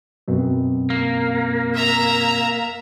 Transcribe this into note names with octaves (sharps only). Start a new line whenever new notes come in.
F#2 B2 C4
A#3
E5 A#5